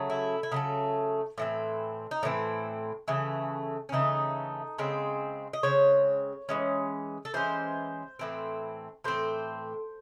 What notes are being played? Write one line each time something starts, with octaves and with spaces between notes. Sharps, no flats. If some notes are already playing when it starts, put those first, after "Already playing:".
Already playing: C#3 F#3 A3
E4
E4
C#3 F#3 A3 D#4
A2 E3 C4
D#4
A2 E3 C4 C#4
C#3 E3 A3
C#4
C#3 E3 A3 D#4
C#3 G#3 C4
D#5
C#3 G#3 C4 C#5
E3 G#3 C#4
A4
E3 G#3 C#4 C5
A2 E3 C4
A2 E3 C4 C5